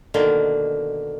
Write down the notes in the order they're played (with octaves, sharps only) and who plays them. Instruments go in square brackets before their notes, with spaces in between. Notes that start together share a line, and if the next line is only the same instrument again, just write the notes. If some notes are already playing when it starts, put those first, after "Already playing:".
[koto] B2 D3 D#3 A#3